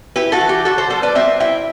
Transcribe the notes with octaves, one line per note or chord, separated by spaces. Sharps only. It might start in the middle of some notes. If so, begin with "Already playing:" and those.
E4 G4 B4
F#4 A4
E3
G4
D3 F#4 A4
A4 C5
G3 A4 C5
B4 D5
C4 C5 E5
E4 E5 G5